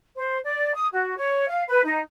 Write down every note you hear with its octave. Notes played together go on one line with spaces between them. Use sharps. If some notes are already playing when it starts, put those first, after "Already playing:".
C5
D5
D#6
F#4
C#5
F5
B4
D#4